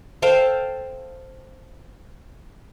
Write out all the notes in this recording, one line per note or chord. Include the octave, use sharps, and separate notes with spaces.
A4 C5 F5 G5